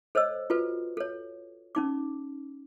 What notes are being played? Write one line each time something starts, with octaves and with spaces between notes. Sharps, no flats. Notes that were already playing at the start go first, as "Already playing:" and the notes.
A4 C5 C#5 D#5 E6
F4 F#4 A4 B4
A4 C#5
C#4 D#4 D6